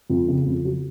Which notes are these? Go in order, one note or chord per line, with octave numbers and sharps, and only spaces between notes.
F2
C#3
F2
F#3